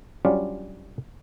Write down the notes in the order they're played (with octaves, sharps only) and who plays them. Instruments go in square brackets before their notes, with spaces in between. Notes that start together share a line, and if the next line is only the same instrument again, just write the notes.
[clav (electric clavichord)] F#3 G3 C#4 D4 F4